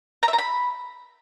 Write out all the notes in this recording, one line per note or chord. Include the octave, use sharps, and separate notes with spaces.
A#5
E5
A#5
B5